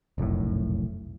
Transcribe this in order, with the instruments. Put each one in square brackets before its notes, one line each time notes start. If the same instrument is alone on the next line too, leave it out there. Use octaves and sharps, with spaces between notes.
[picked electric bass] F1 B1 F#2 A2